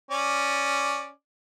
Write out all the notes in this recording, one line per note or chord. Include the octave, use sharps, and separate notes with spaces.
C#4 D5